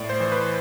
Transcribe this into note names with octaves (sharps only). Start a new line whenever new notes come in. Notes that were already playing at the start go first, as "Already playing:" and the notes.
Already playing: A2 D5
C5
E3
B4